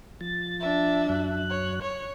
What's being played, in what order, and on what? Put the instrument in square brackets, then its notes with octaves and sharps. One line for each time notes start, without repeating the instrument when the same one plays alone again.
[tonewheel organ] F3 A6
[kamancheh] D4 E5
[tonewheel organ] F#2 F#3 F#6
[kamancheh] C#5
C#5